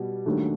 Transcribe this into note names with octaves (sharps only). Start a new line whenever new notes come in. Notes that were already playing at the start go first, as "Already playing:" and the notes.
Already playing: B2 G3
D#2 D#3 F#3 A3 D4